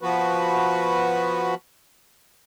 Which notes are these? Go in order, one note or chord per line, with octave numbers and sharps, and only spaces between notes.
F3 B3 F#4 B4